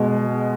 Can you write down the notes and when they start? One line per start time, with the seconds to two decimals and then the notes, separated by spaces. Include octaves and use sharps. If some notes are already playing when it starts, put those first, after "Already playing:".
Already playing: B2 G#3